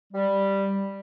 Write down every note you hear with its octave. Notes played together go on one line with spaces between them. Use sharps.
G3